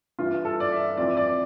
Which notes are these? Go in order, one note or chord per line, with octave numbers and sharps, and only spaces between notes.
G2 E3 F4
A4
D5
E5
F2 E3 D5
D5